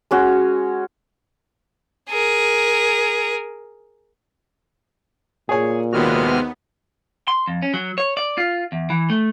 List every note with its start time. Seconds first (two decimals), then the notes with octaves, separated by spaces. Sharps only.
0.11 G#3 C#4 F#4
2.09 G#4 A#4
5.49 A#2 G#4 C#5 G#5
5.93 D#2 C3 G#3 B3 F#4 F6
7.28 C6
7.48 F2
7.62 C#4
7.74 F#3
7.98 C#5
8.17 D5
8.38 F4
8.72 E2
8.90 E3
9.10 A3